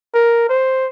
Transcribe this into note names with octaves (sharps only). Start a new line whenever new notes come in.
A#4
C5